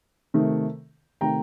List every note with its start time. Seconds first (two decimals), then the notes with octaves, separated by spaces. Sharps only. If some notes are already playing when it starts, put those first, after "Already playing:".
0.34 C3 D#3 A3
1.21 C3 D#3 A3 G5 A#5